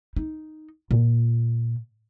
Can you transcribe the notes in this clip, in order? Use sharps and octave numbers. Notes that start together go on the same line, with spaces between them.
D#4
A#2